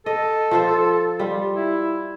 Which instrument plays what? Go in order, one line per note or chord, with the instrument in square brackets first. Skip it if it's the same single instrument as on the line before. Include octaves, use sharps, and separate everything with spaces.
[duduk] A4 [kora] D#5
[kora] F3 F4 C5
G3 F4
[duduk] E4